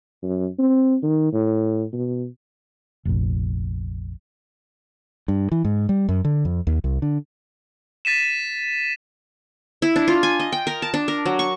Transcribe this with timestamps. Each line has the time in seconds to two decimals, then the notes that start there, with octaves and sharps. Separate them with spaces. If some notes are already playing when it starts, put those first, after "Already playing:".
0.23 F#2
0.59 C4
1.03 D#3
1.33 A2
1.93 B2
3.05 F1 A#1
5.28 G2
5.52 E3
5.65 G#2
5.89 G3
6.09 F#2
6.25 D3
6.45 F2
6.67 D#2
6.84 C2
7.02 D3
8.05 A6 B6 D#7 E7
9.82 E4
9.96 D4
10.08 F4
10.23 G#5
10.40 D#5
10.52 G5
10.67 A#4
10.82 A5
10.94 D4
11.08 A#4
11.26 F#3
11.39 C#6